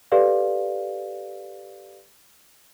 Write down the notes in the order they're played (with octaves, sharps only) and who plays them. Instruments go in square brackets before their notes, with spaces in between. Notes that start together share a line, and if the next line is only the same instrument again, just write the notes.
[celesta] G4 A4 B4 D5 F5